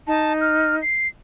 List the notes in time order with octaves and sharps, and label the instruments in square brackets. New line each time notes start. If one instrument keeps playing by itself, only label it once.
[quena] D#4 [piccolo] A5
[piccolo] F6
C7